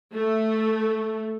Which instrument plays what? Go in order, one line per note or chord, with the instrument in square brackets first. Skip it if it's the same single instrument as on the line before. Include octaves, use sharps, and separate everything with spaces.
[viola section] A3